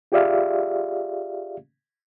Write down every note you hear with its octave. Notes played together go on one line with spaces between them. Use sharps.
F4 G4 G#4 D5 E5 F5